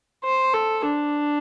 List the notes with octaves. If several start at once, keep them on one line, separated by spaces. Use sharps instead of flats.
C5
A4
D4